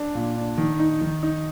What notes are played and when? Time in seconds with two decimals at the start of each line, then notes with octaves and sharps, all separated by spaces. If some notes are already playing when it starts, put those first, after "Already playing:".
Already playing: D4
0.15 A#2
0.36 D4
0.58 D#3
0.79 D#4
1.01 D#3
1.23 D#4